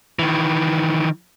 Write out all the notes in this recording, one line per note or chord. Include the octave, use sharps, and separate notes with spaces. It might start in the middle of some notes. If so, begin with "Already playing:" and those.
D#3 E3